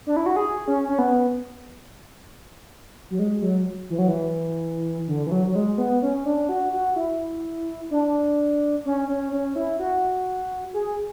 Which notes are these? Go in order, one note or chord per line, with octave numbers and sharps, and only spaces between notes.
D4
E4
F#4
G#4
C#4
C#4
B3
F#3
G#3
F#3
E3
F#3
E3
D3
E3
F#3
F#3
G#3
B3
C#4
D4
F#4
F#4
E4
D4
C#4
C#4
C#4
E4
F#4
G#4